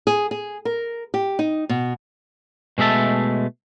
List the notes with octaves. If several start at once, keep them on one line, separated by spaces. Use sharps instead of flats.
G#4
G#4
A#4
G4
D#4
B2
B2 G#3 A3 E5 A5